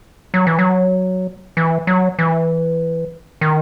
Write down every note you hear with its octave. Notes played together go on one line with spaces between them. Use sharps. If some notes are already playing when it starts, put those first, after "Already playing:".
F#3
E3
F#3
E3
F#3
E3
D#3